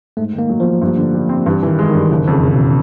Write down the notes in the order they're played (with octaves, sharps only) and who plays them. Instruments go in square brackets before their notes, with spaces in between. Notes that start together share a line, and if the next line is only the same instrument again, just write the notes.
[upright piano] G#2 [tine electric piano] A3
[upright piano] D#3
[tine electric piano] A#3
[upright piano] F#3
[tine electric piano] F3 [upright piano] A#3
[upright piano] G2
D3
G3
C4
[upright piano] G2 [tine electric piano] E3
[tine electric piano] D#3 [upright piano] E3
[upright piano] G#3
[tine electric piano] D#3
[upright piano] G2
[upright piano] F#1 [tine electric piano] C#3
[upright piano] F2 [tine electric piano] C#3
[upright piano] C#3
[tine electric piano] B2